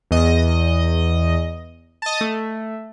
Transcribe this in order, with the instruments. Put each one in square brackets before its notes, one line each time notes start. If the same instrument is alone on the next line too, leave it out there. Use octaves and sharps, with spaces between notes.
[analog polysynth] E2 D#5
D#5 A5
A3